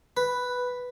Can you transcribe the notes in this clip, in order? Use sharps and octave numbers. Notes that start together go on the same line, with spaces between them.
B4